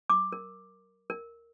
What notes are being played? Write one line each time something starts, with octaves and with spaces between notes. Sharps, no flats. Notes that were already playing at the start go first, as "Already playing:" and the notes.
D6
A#4
A#4